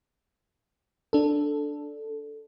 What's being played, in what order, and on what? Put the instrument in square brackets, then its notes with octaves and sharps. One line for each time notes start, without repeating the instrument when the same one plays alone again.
[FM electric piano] D4 A4